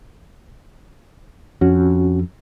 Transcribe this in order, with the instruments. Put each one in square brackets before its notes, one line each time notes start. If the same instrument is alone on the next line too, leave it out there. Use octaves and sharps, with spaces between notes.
[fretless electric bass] F2 [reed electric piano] C#4 F#4